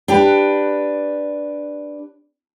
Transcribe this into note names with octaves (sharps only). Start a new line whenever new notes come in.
D4 G4 B4